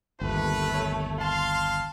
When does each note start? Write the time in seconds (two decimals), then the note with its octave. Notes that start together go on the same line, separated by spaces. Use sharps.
0.21 G1 D#2 A3 B4
0.74 C#5
1.21 F5 A5 C6